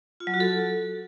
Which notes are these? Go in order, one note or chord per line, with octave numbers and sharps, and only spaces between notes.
F4
F#3
F#4
A4